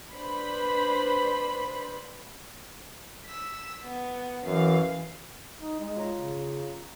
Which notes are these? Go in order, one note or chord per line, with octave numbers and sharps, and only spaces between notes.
D4 B4 C5 B5
E6 B6
B3
F#2 E3 F5
D#4
G#3
F4 C#5 A#5
C#3